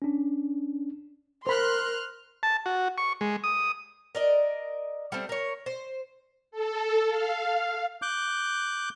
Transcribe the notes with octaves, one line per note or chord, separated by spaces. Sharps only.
C#4 D4
A#4 C5 B5 C6 F6 F#6
A5
F#4
C#6
G#3
D#6
A#4 D5 D#5
G3 A3 C4
A#4 C#5
C5
A4
F5
D6 F#6 G6